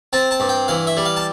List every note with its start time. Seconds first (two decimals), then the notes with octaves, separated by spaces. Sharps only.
0.13 C4 A5
0.31 A5
0.40 G2
0.49 G5
0.68 E3 F5
0.87 E5
0.97 G3
1.06 F5
1.17 A5